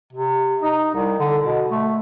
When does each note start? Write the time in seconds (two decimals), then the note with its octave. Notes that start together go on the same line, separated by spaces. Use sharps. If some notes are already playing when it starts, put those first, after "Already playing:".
0.13 C3
0.62 D#4
0.94 C2
1.20 D3
1.44 B2
1.70 A3